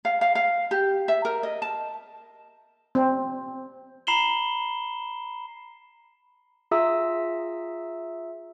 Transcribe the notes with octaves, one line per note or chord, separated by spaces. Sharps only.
F5
F5
F5
G4
E5
A#4
D#5
A5
C4
A#5 B5 C7 E7 F#7 G7
F4 G#4 E5 A#5 D#6 E6